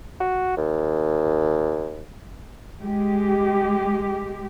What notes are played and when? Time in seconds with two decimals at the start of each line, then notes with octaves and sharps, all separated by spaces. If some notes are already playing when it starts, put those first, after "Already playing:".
0.20 F#4
0.57 D#2
2.81 G#3 G4